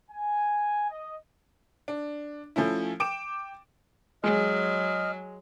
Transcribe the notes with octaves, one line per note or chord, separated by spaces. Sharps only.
G#5
D#5
D4
F3 A3 C#4 E4
G5 D6 D7 E7
F#3 G#3 D#5 F6